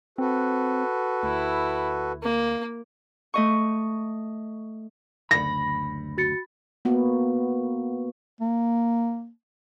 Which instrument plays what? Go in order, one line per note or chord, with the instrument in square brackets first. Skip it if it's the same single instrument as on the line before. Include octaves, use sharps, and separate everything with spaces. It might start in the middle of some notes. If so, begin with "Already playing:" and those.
[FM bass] C4 [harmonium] F#4 A4 B4
[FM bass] D2 [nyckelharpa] E4
[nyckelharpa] A#3
[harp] A3 D#5 C#6
[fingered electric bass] F#1 D2 [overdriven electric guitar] B5 [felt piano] A#6
[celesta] F#4 A6 C#7
[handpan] A#3 B3 F#4
[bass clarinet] A#3